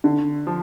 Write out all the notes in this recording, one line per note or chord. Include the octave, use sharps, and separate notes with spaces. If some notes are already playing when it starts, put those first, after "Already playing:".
D3
F3